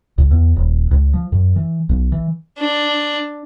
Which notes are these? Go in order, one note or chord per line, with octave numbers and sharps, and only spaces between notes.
C#2
E2
D#1
C#2
F3
F#2
E3
B1
E3
D4